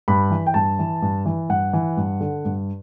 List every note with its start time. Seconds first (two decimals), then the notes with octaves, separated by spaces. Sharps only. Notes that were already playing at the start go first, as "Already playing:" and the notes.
0.08 G2 B5
0.30 E3
0.46 G5
0.54 G2 A5
0.79 E3
1.02 G2
1.25 E3
1.49 G2 F#5
1.73 E3
1.97 G2
2.20 D3
2.45 G2